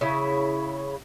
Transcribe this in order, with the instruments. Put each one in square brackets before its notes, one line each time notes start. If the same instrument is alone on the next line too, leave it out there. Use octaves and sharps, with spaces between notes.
[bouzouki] C#3 E4